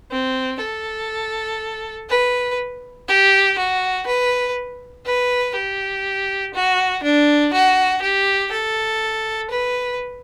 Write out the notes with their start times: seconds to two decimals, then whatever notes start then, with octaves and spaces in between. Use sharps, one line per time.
0.11 C4
0.61 A4
2.09 B4
3.08 G4
3.58 F#4
4.07 B4
5.06 B4
5.56 G4
6.54 F#4
7.03 D4
7.53 F#4
8.02 G4
8.52 A4
9.50 B4